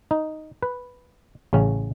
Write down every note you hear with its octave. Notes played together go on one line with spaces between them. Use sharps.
D#4
B4
A1 C#3 C#4